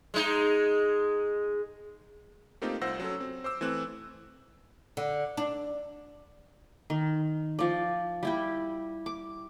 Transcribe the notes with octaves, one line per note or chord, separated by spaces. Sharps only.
G#3 D#4
A3 A#3 C4 D#4 F4 G4
C2 F4 C5 F#5 E6 A#6
F#3 C#4 A4
C4
C5 D6 E6
E3 A3 C4 F#6
D3
D4
D#3
F3 D5
G3 E4 G4
D6